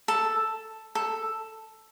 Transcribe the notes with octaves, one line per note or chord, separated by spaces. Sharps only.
A4
A4